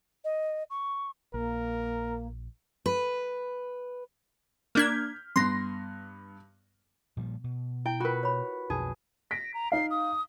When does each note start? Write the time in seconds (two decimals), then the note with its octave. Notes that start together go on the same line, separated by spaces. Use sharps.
0.25 D#5
0.70 C#6
1.34 A#1 A#3 A#4
2.86 B4
4.75 A#3 D4 F6 G6 G#6 B6
5.36 G2 B3 C6 A#6
7.17 A#2 F3 G3
7.44 B2
7.86 E4 G5
8.00 F4 F#4 A#4 B4
8.23 C#5 B5
8.70 B1 F2 B2 D#4 G#4
9.31 A#6 B6 D7
9.54 A#5
9.72 D#4 F5 C7
9.90 D#6